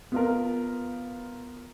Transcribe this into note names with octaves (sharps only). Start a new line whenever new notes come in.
B3 F4 A#4